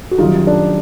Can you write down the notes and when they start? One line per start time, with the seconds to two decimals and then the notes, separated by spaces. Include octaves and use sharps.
0.11 F#4
0.18 F#2 D#3 G3 D#4 F4
0.47 D4